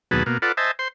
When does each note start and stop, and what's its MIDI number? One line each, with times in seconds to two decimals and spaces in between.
0.11 0.23 39
0.11 0.23 47
0.11 0.23 54
0.11 0.23 68
0.11 0.23 71
0.11 0.23 81
0.26 0.38 47
0.26 0.38 58
0.42 0.52 65
0.42 0.52 69
0.42 0.52 71
0.42 0.52 74
0.42 0.52 78
0.57 0.71 72
0.57 0.71 75
0.57 0.71 76
0.57 0.71 80
0.57 0.71 81
0.79 0.88 72
0.79 0.88 84